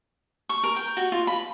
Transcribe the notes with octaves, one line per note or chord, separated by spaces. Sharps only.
C#6
A#4
G5
F#4
F4
B5